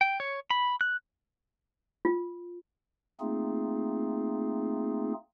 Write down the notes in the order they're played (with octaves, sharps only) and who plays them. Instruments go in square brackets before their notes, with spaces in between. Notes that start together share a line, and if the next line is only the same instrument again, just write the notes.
[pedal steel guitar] G5
C#5
B5
F#6
[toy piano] F4
[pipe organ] A3 A#3 C4 D#4 F4 G#4